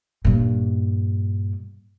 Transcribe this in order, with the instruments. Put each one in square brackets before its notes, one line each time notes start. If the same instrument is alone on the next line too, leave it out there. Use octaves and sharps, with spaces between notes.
[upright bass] G2 A#2